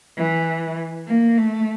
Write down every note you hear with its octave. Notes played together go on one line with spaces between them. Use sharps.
E3
A#3
A3